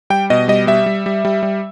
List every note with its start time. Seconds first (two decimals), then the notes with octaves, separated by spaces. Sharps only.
0.10 G3 G5
0.30 B2 D#5
0.48 G3 D#5
0.67 G3 E5
0.86 G3
1.06 G3
1.25 G3
1.43 G3